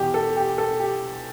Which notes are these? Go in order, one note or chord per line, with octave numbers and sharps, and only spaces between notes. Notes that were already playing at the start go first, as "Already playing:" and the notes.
Already playing: E2 B2 G4
A4
G4
A4
G4